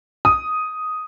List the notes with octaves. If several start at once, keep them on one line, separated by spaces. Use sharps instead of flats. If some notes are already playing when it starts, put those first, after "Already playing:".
D#6